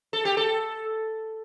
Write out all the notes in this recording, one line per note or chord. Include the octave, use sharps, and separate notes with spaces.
A4
G4
A4